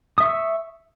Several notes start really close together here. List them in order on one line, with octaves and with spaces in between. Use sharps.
D#6 E5 C#6 E6